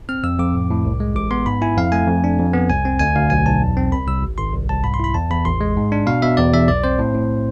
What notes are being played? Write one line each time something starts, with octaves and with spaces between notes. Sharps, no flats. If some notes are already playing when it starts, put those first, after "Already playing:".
C4 F6
F2 E6
F2 D6
A2
A2
C2
G#3
A1 D6
B3 C6
G#2 B5
E4 G#5
F2 F5
A3 G#5
F2
D4
F2
B3
C2 G#5
C4
D2 G#5
D2 F5
B1 G#5
B1 A5
E2
C4
C2 B5
C2 E6
G#1
G#1 C6
C2
C2 A5
G#2 B5
C6
E4 B5
E2 A5
E2 B5
A1 C6
G#3
G#2
D4
B2 F5
B2 E5
E2 D5
E2 E5
B1 D5
C4 C5
A2
A2